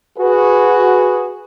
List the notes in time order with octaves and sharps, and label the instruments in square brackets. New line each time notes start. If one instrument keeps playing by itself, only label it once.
[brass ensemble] F#4 G#4 B4